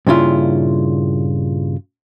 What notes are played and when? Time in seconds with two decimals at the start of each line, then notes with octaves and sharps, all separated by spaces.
0.07 G2 A#2 C#3 E4 F4